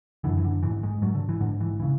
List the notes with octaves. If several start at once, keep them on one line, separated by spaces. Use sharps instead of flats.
F#2 D3 E3
E3
D3
G#2 E3
G#3
G#2 F#3
D3
E3
G#2 D3
E3
C#3 E3